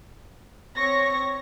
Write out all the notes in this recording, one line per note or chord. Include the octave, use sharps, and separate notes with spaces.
C4 C#5 C#6 A#6